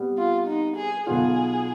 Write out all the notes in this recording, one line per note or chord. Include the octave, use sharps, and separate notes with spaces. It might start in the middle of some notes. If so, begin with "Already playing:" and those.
Already playing: C3 G3 B3
F4
D#4
G#4
B1 B2 B3 F4 G#4